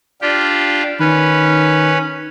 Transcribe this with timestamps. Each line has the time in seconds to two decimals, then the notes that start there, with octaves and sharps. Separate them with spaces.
0.22 D4 F4 G4
1.00 D#3 C#4 B4